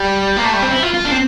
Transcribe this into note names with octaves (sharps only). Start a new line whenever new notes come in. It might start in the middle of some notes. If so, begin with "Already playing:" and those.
Already playing: G3
A#3
A3
G3
C4
E4
F4
F4
D4
C4